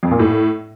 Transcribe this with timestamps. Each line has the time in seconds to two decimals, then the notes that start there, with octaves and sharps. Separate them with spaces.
0.03 F2
0.11 A#2
0.19 A2